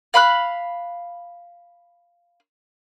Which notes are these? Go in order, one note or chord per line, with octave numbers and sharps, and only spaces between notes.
F5 B5 C6 F#6